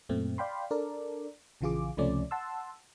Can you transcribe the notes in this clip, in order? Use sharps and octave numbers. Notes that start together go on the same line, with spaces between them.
F#2 A#2 A3 C4
D5 F5 G5 B5 C6
D4 A4 A#4 D5
A#1 C#3 E3 F4 G#4 D6
C#2 C3 F3 A3 C#4 D5
F#5 A5 C6 E6